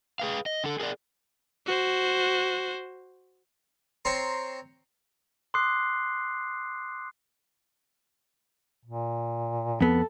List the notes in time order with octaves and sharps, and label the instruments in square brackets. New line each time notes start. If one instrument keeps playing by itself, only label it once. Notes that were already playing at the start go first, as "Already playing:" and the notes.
[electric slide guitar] G#4 B4 F5
D#5
D3 A4
G#4 A#4 C5 D5
[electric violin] F#4 C5
[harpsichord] C4 C#5 A#5 C6
[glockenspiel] C6 D6 D#6 F#6 C7
[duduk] A#2
[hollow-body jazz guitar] F2 B3 [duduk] A4